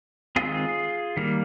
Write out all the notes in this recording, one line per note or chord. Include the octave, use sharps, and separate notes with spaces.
D#3 G#3 C4 F4 G#4
D#3 G3 A#3